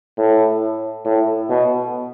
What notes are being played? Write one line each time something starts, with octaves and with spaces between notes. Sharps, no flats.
A2
A2
B2